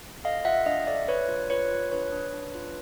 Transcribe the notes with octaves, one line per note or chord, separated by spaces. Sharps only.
A4 D#5 F5
F4 E5 F#5
D4 D#5 F5
A4 D5 E5
D4 B4 C#5
F4
F4 B4 C#5
F4
D4 B4 C#5
D4
D4
F4